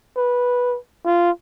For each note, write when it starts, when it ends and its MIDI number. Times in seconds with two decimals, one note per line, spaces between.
0.17 0.77 71
1.06 1.31 65